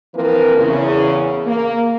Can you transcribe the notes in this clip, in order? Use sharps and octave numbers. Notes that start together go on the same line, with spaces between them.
E3 F3 A#3 C4 A#4 B4
E2 C#3
A#3